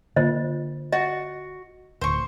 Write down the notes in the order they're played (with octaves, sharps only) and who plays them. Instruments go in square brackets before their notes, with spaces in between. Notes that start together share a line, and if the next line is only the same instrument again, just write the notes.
[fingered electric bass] D3 A#3 [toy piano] F4 C5 D#5
[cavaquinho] F#4 [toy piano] D#5
[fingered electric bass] D1 D2 [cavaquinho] C5 C#6